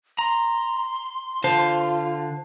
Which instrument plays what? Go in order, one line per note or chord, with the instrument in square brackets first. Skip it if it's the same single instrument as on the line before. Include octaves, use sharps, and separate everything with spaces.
[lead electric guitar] A#5 [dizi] C6
[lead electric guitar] D3 [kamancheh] F4 [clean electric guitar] C5 A5